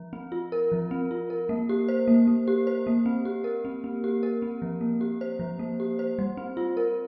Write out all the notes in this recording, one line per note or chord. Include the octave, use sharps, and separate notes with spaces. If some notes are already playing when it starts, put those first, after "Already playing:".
Already playing: F3
C4
F4
A#4
F3
C4
F4
A#4
A#3
G4
C5
A#3
A#3
G4
C5
A#3
C4
G4
A#4
C4
C4
G4
A#4
C4
F3
A#3
G4
C5
F3
A#3
G4
C5
G3
C4
F4
A#4